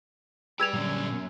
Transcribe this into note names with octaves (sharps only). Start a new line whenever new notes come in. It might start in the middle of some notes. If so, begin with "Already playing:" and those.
G4 G#4 B4 D5 E6 G#6 F7
F#2 A#2 D3 G3 D4